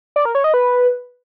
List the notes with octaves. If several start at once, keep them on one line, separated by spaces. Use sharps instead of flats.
D5
A#4
C#5
D#5
B4